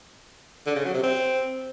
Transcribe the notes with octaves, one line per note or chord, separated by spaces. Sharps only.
D3
C#3
F#3
C3
C4